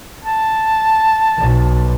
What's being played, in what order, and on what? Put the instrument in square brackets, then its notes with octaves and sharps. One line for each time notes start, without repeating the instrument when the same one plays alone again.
[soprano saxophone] A5
[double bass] B1